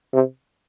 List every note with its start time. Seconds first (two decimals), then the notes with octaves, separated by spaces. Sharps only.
0.14 C3